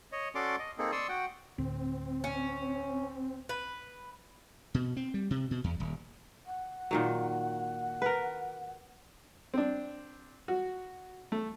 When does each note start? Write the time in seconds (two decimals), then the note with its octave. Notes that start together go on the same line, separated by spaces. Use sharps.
0.12 C#5 D#5
0.35 C#4 F#4 A4 D5 C6 D6
0.59 D#5
0.78 A#3 C4 D#4 G#4 A4
0.92 D5 C6 C#6 D#6 E6
1.09 F#4 F#5 G5
1.58 D2 A2 C4
2.24 C#4
3.49 B4
4.74 B2
4.97 C4
5.14 G3
5.31 C3
5.51 B2
5.64 E2
5.80 D#1
6.46 F#5
6.91 A#2 D#3 F#3
8.02 A#4 B4
9.54 C4 D4
10.48 F#4
11.32 A3